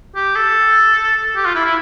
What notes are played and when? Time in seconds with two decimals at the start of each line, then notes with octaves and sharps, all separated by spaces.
0.16 G4
0.36 A4
1.36 G4
1.46 F4
1.55 E4
1.65 E4